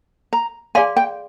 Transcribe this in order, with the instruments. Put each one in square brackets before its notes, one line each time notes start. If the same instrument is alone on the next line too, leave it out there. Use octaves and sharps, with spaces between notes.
[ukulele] A#5
[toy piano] G#4 D5 F5 C6 [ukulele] G#5
[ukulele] G5